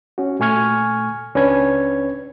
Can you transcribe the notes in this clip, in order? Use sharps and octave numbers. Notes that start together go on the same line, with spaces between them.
C#4 F#4
A#2 A3 G#5 C#6 F6 G#6
C#2 C#4 D4 B4 C#5 G#6